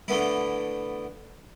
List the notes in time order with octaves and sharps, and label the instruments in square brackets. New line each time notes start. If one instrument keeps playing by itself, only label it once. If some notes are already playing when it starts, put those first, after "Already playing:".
[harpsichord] D3 A3 B3 E4